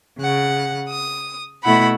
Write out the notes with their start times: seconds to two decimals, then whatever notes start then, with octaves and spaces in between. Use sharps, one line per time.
0.19 C#3 F#5
0.88 D#6
1.63 B2 A3 E4 F#5 B5